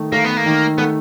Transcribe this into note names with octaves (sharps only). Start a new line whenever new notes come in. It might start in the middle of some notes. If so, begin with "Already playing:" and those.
Already playing: D#3 A3
A3 A#3
B3
A#3
D#3
A3 B3